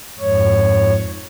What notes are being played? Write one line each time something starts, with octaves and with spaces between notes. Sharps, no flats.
F2 G#2 C#5